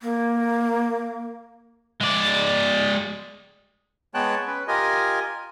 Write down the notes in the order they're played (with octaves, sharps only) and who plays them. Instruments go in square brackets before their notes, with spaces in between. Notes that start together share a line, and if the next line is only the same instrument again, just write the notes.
[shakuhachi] A#3
[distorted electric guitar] G#3 D5
[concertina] G#3 B3 C#5 G5 A5 F#6
C#4 B4
F4 G4 A#4 D#5 G#5